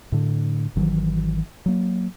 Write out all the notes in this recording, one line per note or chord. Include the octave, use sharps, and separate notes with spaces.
A2 D3
G#1 D#3 E3 F#3
F#3 A#3